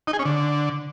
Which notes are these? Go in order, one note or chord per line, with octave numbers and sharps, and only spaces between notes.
D#4
G#4
C#4
D3